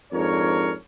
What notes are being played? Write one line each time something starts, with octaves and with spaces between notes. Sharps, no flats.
F2 G#2 D4 A#4 C#5